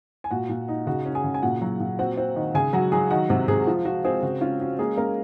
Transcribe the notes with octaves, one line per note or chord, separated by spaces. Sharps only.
G#5
A#2 F#4 F#5
A#2
D#4
C#3 F#4 F#5
C#4
G#4 G#5
C#3
G#5
A#2 F#4 F#5
F#3
A#2
C4 F#4 F#5
C4
D#3
C#3 G#4 G#5
F#3 F#4 F#5
F#3 G#4 G#5
D#3 F#4 F#5
C3 F#4 F#5
C3 G#3 G#4
F3 F4
F3 F#4
G#3 C4 G#4
C#3 F#4
C#4 F4
C#4 F#4
G#3 A#3 G#4
A#3 C#4 A#4